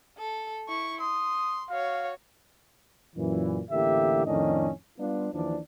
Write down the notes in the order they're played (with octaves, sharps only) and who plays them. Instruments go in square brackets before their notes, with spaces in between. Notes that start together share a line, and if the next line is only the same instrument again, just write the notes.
[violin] A4
E4 C#6
[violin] C6 [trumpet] D#6
[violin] F#4 C#5 [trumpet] F5
[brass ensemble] F#2 A#2 E3
A1 A2 D3 A#3 G4 E5
F2 A2 D#3 C#4 D4 D#5
G3 B3 D4 F4
D#2 E3 F3 D4